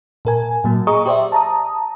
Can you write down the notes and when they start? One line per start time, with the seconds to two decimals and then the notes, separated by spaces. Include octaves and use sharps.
0.25 A#2 A#4 G#5
0.64 A#2 F#3 A#3
0.87 G#4 D#5 A#5 C#6 D#6
1.06 G4 C5 D5 E5
1.32 A5 A#5 D#6